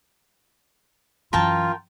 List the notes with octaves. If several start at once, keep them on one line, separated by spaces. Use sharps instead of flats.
F#2 E3 F4 A#4 G5 A5